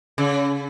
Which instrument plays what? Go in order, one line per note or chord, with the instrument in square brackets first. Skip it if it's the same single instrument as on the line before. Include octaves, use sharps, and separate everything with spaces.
[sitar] C#3